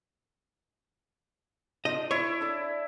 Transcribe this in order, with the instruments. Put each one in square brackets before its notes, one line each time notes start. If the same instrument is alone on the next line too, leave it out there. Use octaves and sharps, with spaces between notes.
[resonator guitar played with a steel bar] D4 D#4 F4 [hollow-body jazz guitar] D#5
[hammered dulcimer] E4 [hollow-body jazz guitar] C#5
[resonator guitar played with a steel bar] D4 A4 D5